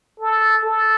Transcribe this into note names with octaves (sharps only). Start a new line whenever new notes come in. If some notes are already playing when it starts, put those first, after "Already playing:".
A4
A4